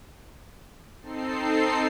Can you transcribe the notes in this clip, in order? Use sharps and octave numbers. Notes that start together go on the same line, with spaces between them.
C4 D#4 A4 C7